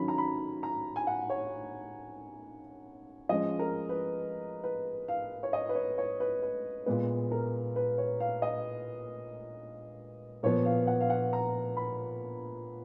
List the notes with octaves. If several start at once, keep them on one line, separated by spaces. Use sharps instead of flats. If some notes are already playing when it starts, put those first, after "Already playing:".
Already playing: D#3 F#3 C#4 B5
A#5
B5
A#5
G#5
F#5
C#5
F3 G#3 C#4 D#5
A#4
B4
B4
F5
C#5
D#5
B4
C#5
C#5
B4
B4
A#2 G#3 B3 B4
A#4
B4
C#5
F5
D#5
A#2 F3 B3 C#5
F5
F#5
F5
F#5
A#5
B5